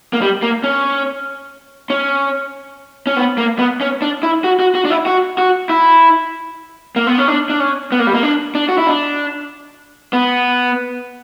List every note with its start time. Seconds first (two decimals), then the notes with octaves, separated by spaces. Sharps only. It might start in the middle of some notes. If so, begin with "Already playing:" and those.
0.13 A#3
0.21 G3
0.42 A#3
0.64 C#4
1.90 C#4
3.07 C#4
3.17 B3
3.38 A#3
3.59 B3
3.81 C#4
4.02 D4
4.23 E4
4.44 F#4
4.60 F#4
4.75 F#4
4.85 D4
4.90 E4
5.06 F#4
5.38 F#4
5.69 E4
6.96 A#3
7.07 B3
7.18 C#4
7.28 D4
7.50 D4
7.60 C#4
7.92 B3
8.00 A#3
8.07 G3
8.14 A#3
8.23 D4
8.55 D4
8.69 F#4
8.78 E4
8.87 D4
10.13 B3